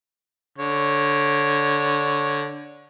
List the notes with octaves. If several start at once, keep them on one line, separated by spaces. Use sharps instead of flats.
D3 C#5